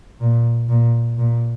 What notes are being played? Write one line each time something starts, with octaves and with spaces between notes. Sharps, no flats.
A#2
A#2
A#2